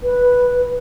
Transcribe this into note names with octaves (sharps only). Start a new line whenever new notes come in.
B4